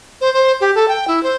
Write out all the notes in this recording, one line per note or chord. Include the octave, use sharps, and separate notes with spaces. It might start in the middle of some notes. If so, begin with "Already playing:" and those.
C5
C5
G4
A4
G5
E4
C5